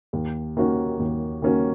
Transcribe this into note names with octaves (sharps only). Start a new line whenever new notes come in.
D#2
D#3 A#3 C#4 F#4
D#2
D#3 A#3 C#4 F#4